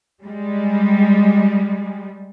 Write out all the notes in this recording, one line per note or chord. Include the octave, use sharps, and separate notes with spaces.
G3 G#3